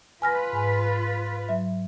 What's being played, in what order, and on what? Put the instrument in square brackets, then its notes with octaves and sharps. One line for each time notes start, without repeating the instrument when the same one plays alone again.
[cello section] F4 B4 [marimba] G#5 F6 A#6
[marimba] G#2 G#5
F#3 E5